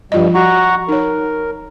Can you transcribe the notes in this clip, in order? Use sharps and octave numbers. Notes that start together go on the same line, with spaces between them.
G2 F3 G3 F4 D#5
F#4 F#5 A#5 C#6
D#4 A#4 C#5